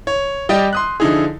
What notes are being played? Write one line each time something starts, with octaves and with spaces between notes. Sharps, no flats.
C#5
G3 G4 D5 D#5 G5
C6 D#6 F#6
D3 F3 D#4 E4 G#4